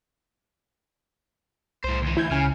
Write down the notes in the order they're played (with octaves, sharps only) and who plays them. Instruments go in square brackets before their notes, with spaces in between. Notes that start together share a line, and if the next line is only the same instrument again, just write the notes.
[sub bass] C2 [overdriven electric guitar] A2 C5
[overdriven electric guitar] D2 E3
[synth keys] E4 G6 G#6
[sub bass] C#2 [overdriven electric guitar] C#3 [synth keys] G#5 F6